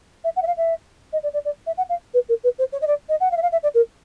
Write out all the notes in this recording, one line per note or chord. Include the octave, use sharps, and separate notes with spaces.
E5
F#5
E5
F5
E5
D#5
D5
D5
D5
E5
F#5
F5
B4
A#4
B4
C5
C#5
D#5
D5
D#5
F#5
F5
E5
F5
E5
D5
A#4